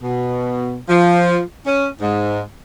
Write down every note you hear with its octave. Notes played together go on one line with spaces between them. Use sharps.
B2
F3
C#4
G#2